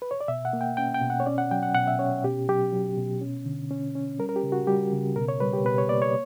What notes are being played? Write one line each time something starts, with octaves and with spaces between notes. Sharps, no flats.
B4
C#5
D5
B2 E5
F#5
A#3
G5
C#4 G5
G5
B2
F#5
C#5
C#4 D5
F#5
F#3 G5
F#5
B2 F#5
E5
C#4 C#5
B2 G4
F#3 G4
F#3
B2
C#4
D3
C#4
C#4
G3 A#4
A#4
G4
C#3
F#4
G3 G4
C#3
B2 A#4
C#5
G3 B4
G4
B2 B4
C#5
A#3 D5
C#5